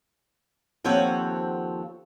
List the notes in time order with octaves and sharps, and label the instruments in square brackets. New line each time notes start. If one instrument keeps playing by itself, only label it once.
[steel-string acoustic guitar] D#2 F3 C4 A4 C#5 F#5